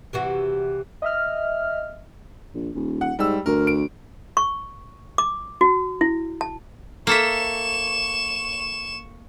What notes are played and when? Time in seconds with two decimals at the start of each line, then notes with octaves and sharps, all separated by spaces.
0.13 C3 E3 F#4
1.02 D#5 E5 F6
2.54 A#1
2.75 D#1
3.01 F#5
3.19 G#2 G3 E6
3.46 D2 A#4
3.67 D7
4.37 C#6
5.18 D6
5.61 F#4
6.01 E4
6.41 A5
7.07 A#3 A4 E5 C#6 E7